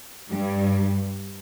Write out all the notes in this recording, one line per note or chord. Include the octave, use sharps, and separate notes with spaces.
G2 G3